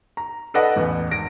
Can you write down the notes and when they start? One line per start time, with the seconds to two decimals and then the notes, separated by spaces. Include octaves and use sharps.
0.17 A#5
0.54 A4 B4 D5 D#5 F#5 A5
0.76 A1 E2 B3
1.11 G#1 A#6 D7